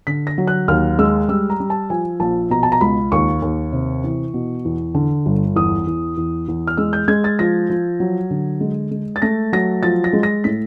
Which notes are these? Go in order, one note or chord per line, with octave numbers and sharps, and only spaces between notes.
D3 B6
A#6
F#3
F#6
D#2 F6
G#3 E6
G3 E6
A#5
G3
A5
F3 G#5
A#1 A5
B2 A#5
A5
A#5
C#2 B5
D#2 C#6
D#2
C3
E3
B2
E2
D3
G1
E2 D#6
E2
E2
E2
F6
G#3 E6
G6
G#3 G#6
A6
F3 A#6
F3
F#3
D3
G#3
G#3
A6
A3 A#6
F#3 A#6
F3 A6
A#6
G#3
A#6
A2 B6